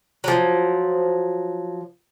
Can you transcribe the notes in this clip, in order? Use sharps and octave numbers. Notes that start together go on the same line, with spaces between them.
F3 F#3